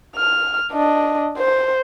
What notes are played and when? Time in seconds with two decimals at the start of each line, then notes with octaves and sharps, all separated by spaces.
0.16 F6
0.72 D4 D#5
1.38 C5